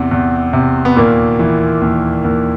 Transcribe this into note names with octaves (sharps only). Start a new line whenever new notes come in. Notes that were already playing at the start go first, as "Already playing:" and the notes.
Already playing: E2 C3 C4
E2
C3
B3
D#2 A#2 A#3
E3
D#2
D#2